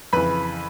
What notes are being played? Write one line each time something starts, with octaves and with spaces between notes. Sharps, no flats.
F2 C#3 E3 B4 B5